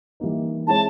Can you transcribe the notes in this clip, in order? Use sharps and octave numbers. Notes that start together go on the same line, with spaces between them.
E3 G3 A#3 D#4
G#3 C4 E4 G#4 C#5 A5